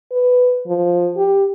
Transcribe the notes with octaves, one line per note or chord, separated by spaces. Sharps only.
B4
F3
G4